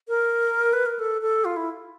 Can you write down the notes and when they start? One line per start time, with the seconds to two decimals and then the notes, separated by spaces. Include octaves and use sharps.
0.08 A#4
0.73 B4
0.86 A#4
0.99 A4
1.22 A4
1.45 F4
1.56 E4